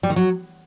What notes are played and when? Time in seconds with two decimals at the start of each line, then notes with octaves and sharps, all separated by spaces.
0.03 G3
0.10 D#3
0.16 F#3